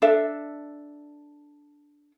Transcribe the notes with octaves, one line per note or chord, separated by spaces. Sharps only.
D4 A4 E5